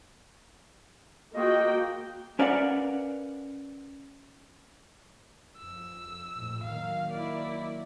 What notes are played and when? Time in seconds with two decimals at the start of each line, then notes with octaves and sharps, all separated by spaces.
1.35 A#3 F4 F#4 G#4 D#5 G5
2.39 C#4 A#4 B4 D5 F5 F#5
5.58 F2 E6
6.34 A#1 F2 A2
6.64 D#3 F#3 A#3 F5
7.12 E4 D5